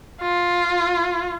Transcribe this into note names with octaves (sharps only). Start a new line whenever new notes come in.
F4